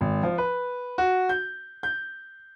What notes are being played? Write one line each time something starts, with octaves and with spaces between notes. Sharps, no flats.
G#1
F3
B4
F#4
G6
G6